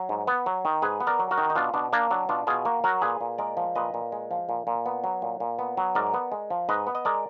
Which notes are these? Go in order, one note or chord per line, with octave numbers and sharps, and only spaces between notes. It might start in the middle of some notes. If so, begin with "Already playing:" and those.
Already playing: F#3
G#2
B3
F#3
D#3
G#2 G#4 B4
B3
A#4 D5
F#3
F#4 A#4
D#3
D#4
B2 D4 F4
B2 D4
A#3 D4
F#3 D4
B2 D4 F4
B2 F4 G#4
A#3 F#4 A#4
F#3 F#4 A#4
A#2 G#4 B4
A#2
G#3 A#4 D5
F3
A#2 B4 D#5
A#2
G#3
F3
A#2
A#2
B3
F#3
A#2
A#2
B3
F#3
G#2 A#4 D5
B3
G#3
F3
G#2 B4 D#5
B3
D#5
G#3 A#4 D5